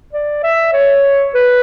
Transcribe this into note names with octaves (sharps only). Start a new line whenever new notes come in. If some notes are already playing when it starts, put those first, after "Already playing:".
D5
E5
C#5
B4